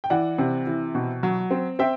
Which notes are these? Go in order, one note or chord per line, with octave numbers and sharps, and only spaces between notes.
G5
E3 D5 F#5
C3
E3
B2
F#3
C4
C4 E5 G5